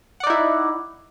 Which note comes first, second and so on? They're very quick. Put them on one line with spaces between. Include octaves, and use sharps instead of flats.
F#5 D5 D#4 E4